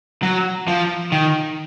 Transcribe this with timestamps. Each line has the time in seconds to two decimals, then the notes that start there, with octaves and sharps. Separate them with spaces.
0.23 F#3
0.68 F3
1.12 D#3